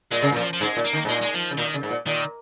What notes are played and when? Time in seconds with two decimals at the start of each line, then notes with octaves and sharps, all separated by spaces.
0.12 A#2 G#3
0.22 C#3
0.32 A#2
0.37 F3
0.53 F3
0.61 G#2 G#3
0.77 A#2
0.85 A#3
0.93 D#3
1.05 G#2
1.09 A#2 G#3
1.22 G#3
1.34 F3
1.51 C#3
1.58 A#2 D#3
1.74 C#3
1.83 G#2
1.90 A#2
2.06 A#2 D#3